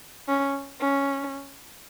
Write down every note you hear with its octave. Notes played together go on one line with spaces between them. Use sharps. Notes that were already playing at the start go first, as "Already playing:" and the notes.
C#4
C#4